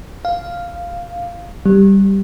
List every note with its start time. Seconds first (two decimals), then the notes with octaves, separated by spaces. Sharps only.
0.25 F5
1.66 G3